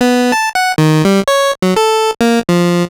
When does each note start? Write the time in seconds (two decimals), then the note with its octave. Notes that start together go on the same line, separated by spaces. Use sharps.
0.01 B3
0.32 A5
0.55 F#5
0.78 D#3
1.05 G3
1.28 C#5
1.62 F#3
1.76 A4
2.21 A#3
2.49 F3